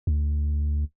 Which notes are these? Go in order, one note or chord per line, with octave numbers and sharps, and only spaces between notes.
D2